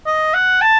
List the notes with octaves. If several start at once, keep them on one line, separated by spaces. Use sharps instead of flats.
D#5
F#5
A5